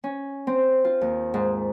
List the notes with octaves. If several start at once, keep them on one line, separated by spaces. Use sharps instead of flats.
C#4
C4
F4
D#2
G#2